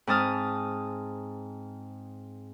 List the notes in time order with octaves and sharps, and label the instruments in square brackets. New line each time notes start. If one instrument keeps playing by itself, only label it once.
[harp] G#2 C4 A5 D#6 F6